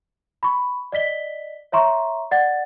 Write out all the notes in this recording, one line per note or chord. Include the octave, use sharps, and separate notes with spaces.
B5 C#6
D5 D#5 B6 G7
C#5 E5 A#5 C6 C#6
D5 F#5 A6